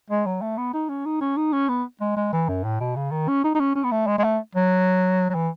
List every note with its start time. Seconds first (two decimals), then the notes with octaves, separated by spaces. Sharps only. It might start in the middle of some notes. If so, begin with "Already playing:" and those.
0.10 G#3
0.26 F#3
0.41 A3
0.57 B3
0.74 D#4
0.89 C#4
1.06 D#4
1.21 C#4
1.37 D#4
1.53 C#4
1.69 B3
2.01 G#3
2.16 G#3
2.33 E3
2.48 F#2
2.64 A2
2.80 B2
2.96 C#3
3.11 D#3
3.28 C#4
3.44 D#4
3.55 D#4
3.60 C#4
3.75 C#4
3.84 B3
3.91 A3
4.07 G#3
4.18 G#3
4.24 A3
4.55 F#3
5.30 F#3
5.34 E3